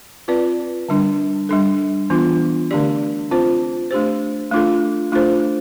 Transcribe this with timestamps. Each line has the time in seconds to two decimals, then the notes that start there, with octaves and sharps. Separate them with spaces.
0.28 C4 F4 B4 D5
0.89 D3 G3 D4
1.49 G3 D4 A4
2.10 E3 B3 D4 F4
2.71 D3 A3 D4 G4 D5
3.31 C4 F4 C5
3.91 A3 D4 G4 C5
4.52 A3 D4 F4 A4
5.12 A3 D4 F4 A4 C5